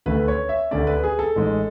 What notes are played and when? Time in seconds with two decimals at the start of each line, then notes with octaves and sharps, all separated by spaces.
0.06 D2 D3 A3 C#4 B4
0.28 C#5
0.49 E5
0.71 D2 D3 A3 C#4 D5
0.87 B4
1.04 G#4
1.19 A4
1.36 A1 G#2 G#3